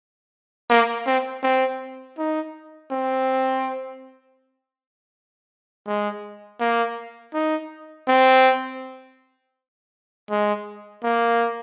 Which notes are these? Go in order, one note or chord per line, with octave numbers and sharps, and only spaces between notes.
A#3
C4
C4
D#4
C4
G#3
A#3
D#4
C4
G#3
A#3